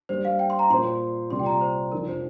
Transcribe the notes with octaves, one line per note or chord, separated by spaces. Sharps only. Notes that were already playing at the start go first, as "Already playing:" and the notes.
G2 G3 A#3 C5
F5
G5
C6
A#5
A#2 F3 A#3 F4 C5 C6
C2 C3 A#3 F4 D5 C6
G5
A#5
C5
F1 F2 F3 D4 A#4
C5